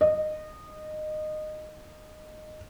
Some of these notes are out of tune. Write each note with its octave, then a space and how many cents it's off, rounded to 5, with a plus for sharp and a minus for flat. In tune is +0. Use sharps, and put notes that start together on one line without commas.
D#5 -20